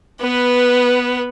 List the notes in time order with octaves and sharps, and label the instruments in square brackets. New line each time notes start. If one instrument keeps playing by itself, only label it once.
[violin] B3 B4